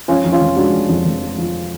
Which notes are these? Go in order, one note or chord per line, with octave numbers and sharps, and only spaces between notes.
F3 C#4 F4
F2
C#4 F4
F1
G#3 D4 F#4
F3
F2
F1
G#3
F3